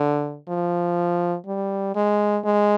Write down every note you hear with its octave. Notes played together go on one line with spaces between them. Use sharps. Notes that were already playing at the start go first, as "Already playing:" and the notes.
Already playing: D3
F3
G3
G#3
G#3